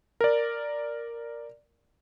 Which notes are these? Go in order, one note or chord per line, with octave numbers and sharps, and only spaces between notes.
A#4 D5